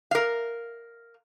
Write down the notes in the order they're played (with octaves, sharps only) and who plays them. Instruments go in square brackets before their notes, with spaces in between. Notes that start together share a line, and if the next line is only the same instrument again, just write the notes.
[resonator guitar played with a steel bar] A#4 F5